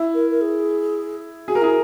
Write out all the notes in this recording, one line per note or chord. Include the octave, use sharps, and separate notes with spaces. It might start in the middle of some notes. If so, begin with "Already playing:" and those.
Already playing: E4
A#4
A#4
G#4
F#4 G#4
A#4
E4 G#4